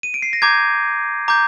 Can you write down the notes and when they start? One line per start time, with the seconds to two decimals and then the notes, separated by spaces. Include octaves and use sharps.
0.03 D#7
0.14 D7
0.22 C7
0.33 A#6
0.42 A#5 D6 G6 G#6
1.28 A#5 D6 G6